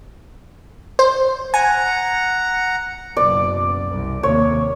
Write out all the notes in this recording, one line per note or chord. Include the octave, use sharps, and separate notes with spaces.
C5
F#5 G#5 A#5
F#1 B2 D5
C2
D#2 C3 A#3 C#5